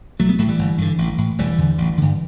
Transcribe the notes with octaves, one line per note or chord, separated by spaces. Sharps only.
B1 F#3 A3
G3 B3
A2 F#3 A3
E3 G3
G1
G2 D3
A1
A2
E1 E3 G3
E2 D3
A1
G2 D3